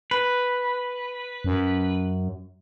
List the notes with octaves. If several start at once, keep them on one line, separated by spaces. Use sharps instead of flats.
B4
F#2